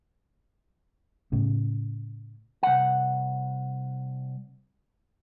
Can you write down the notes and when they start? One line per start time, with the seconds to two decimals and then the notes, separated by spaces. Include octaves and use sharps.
1.32 A2 C#3
2.63 C2 F#5